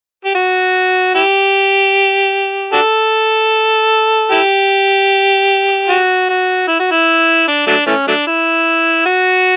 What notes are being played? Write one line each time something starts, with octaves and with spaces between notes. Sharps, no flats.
G4
F#4
E4 G4
D4 F#4 A4
E4 G4
F#4
F#4
E4
F#4
E4
D4
F#3 A3 D4
E3 A3 C#4
F#3 A3 D4
E4
F#4